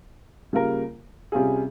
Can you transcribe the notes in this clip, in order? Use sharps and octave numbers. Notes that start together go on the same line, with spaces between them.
C#3 G3 A#3 F4 A#4
C3 G3 C#4 F4 G#4